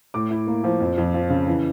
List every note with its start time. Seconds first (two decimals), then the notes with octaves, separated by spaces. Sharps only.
0.14 A2 D6
0.30 E4
0.47 A#3
0.64 F3
0.80 F2
0.97 F2
1.14 F3
1.30 C#3
1.47 E3